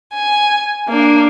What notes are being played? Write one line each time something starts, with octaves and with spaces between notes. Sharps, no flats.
G#5
A#3 D4